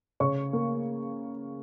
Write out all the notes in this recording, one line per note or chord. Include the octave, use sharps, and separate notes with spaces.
C#3 C#5 C#6
A#3